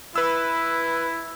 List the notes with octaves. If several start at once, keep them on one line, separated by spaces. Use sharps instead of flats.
E4 B4 E6